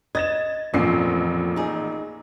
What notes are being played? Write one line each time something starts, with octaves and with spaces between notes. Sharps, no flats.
D#5 G#6 A6 E7
A1 F2 A#2 C#4 C7
D#4 G#4